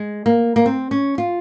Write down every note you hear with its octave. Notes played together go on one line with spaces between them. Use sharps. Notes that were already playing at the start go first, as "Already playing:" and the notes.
Already playing: G#3
A#3
A#3
C4
C#4
F4